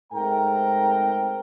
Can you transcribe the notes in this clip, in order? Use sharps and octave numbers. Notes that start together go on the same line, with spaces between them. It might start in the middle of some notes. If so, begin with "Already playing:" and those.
G#2 A3 C4 A#4 G5 A#5